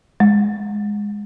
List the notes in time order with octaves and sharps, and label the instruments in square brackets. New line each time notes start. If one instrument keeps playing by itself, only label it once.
[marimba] G#3